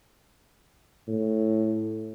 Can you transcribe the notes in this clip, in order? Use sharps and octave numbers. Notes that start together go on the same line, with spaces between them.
A2